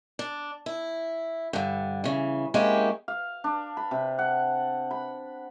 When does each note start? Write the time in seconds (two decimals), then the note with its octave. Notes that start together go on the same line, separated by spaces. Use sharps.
0.19 D4
0.66 E4
1.53 G2 D3
2.04 C#3 E3
2.54 G#3 A#3 C4 C#4 E4 G4
3.08 F5
3.44 D4
3.77 B5
3.91 C3
4.19 F#5
4.91 B5